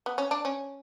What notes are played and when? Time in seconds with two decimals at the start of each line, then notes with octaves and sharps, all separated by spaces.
0.06 B3
0.18 C#4
0.31 D4
0.45 C#4